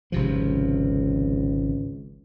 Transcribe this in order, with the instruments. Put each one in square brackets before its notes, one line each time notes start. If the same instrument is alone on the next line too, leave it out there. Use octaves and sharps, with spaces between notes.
[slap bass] G#1 C3 F3 [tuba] C#2